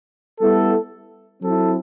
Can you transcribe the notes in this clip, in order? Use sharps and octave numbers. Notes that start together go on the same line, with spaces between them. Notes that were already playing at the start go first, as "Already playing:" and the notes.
G3 B3 E4 A4
F#3 C4 E4 A4